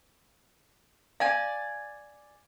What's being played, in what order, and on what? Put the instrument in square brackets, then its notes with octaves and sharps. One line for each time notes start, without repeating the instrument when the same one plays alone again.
[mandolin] D5 G#5 [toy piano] F5